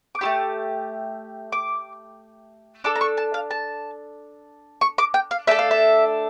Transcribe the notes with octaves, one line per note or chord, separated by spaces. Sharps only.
D6
A3 E4 G4 C#6
D6
D4 A4 D6
A#5
C#6
A5
F5
A5
C#6
D6
G5
F5
A3 D4 A4 E5
F5
E5